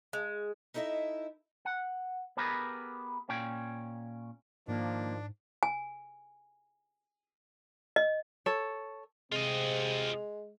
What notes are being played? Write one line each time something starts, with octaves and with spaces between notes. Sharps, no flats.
G#3
D#4 E4 A4 D#5 E5
F#5
B3 G4 G#4 A#4 B4
A#2 C#4 G5
G#2 D#3 F3 A#3 D4
G#5
D#5
A4 C#5
C3 G#3 C4 F4 D#5